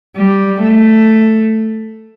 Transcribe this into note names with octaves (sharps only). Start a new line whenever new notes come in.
G3
A3